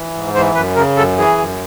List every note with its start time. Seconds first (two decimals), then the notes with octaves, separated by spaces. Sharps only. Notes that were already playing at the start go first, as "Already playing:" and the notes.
Already playing: E3
0.15 G#2
0.35 E3 C5
0.55 F#2 B4
0.76 C#3 A#4
0.96 F#2 A4
1.18 E3 G#4
1.38 F#2